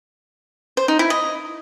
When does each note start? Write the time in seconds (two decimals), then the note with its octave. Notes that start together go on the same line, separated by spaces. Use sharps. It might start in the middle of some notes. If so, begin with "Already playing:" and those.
0.77 C5
0.88 D#4
0.99 E4
1.10 D#5